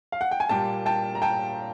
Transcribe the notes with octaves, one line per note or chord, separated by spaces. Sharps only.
F5
F#5
G5
G#5
A#2 G3 A#3 G5 A5
G5 A5
A#5
G5 A5